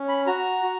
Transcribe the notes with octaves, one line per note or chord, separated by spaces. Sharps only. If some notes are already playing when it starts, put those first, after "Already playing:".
Already playing: C#4
B5
F#4 A#5
F#4